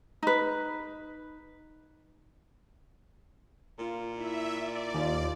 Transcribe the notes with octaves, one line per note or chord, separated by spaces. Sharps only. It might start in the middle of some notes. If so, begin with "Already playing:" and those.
D#4 B4
A#2 F4
E4 E5
D5
D#2 D#4 F4